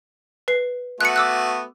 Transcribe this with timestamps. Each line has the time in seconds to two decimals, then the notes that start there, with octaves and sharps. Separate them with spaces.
0.48 B4 C7
1.01 A3 B3 F#4 F#6 C#7
1.16 D6 E6 F#6